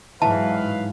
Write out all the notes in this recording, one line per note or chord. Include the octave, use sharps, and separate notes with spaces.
G#2 E3 F#3 B4 F5 A5